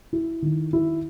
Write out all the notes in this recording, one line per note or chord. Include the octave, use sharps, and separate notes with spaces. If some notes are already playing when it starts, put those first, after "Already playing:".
E4
D#3
E4